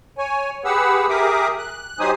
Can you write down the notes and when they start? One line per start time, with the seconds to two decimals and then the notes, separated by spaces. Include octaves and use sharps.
0.18 C#5 G#5
0.64 G4 G#4 B4 F#5 E6
1.09 G4 G#4 A#4 E5 D6 D#6
1.58 F#6
1.99 F#3 D#4 G4 C5 G#5 D#6